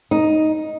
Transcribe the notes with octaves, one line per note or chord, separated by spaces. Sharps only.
D#4